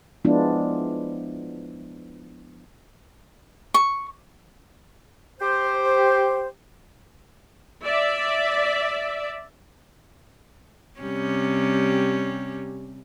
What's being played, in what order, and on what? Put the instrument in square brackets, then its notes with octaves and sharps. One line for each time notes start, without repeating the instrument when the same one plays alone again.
[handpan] F3 G#3 B3 D4 E4 F4
[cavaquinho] C#6
[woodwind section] G4 C5
[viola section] D5 E5
[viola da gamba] C3 G3 C#4